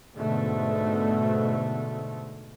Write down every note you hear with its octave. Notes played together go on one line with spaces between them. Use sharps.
G#2 B2 D3 A3